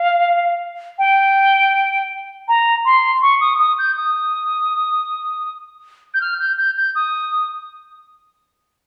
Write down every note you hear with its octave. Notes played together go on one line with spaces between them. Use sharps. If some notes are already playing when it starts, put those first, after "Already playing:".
Already playing: F5
G5
A#5
C6
C#6
D#6
D#6
G6
D#6
G6
F6
G6
G6
G6
D#6